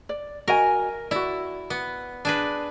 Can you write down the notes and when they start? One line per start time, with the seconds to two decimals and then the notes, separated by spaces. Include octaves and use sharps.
0.09 D5
0.48 F#4 A#4 D#5 G#5
1.11 E4 F#4 D5
1.70 B3
2.25 D4 G#4 B4